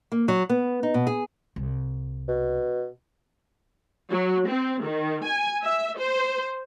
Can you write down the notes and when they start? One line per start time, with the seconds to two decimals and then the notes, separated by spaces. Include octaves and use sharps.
0.12 A#3
0.28 F#3
0.49 B3
0.83 D#4
0.94 B2
1.07 G#4
1.56 C2
2.28 B2
4.10 F#3
4.49 C4
4.82 D#3
5.26 G#5
5.63 E5
5.98 C5